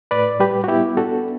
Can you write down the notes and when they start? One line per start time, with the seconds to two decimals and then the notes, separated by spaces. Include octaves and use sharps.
0.11 A2 B4 D5
0.40 G3 G4 B4
0.64 F#4
0.68 B3 E4 G4
0.97 D4 F#4 A4